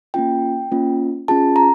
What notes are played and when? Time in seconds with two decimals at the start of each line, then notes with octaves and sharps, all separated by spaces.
0.14 A#3 C#4 F4 G5
0.72 A#3 C#4 F4
1.28 C#4 F4 G#4 A5
1.56 A#5